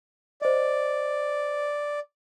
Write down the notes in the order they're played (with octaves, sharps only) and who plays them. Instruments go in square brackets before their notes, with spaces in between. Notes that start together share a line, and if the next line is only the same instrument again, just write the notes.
[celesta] C5 D#5 [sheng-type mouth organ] D5